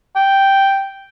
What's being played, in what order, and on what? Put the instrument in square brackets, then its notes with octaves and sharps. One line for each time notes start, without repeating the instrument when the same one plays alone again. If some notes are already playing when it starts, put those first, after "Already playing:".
[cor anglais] G5